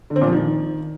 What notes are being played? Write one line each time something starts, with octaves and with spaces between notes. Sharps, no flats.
D3
C4
A#2
F3
D#3